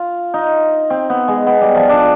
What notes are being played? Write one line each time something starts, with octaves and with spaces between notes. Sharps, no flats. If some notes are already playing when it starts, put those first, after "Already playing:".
Already playing: F4
D#4
C4
B3
G#3
B3
G3
F3
D4